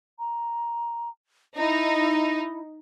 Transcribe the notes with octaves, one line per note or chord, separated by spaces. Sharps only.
A#5
D#4 E4